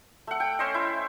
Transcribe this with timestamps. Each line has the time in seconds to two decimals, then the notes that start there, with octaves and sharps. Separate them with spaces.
0.27 A3 F#5
0.40 G5
0.59 C#4 C5 D#5
0.74 E4